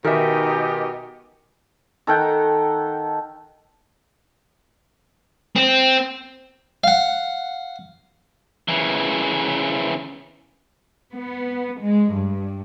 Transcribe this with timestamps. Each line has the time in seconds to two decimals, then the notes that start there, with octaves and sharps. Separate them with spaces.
0.04 B2 D#3 D#4 G4 A#4 E5 G#5
2.07 D#3 A4 F#5 G5
5.56 C4
6.84 F5 F#5
8.68 C#3 E3
11.13 B3
11.80 G#3
12.12 G2